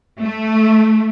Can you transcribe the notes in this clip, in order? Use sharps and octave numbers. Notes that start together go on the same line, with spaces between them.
A3